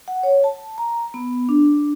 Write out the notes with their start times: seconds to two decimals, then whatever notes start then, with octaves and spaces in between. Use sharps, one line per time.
0.08 F#5
0.23 C#5
0.44 A5
0.78 A#5
1.14 B3
1.49 D4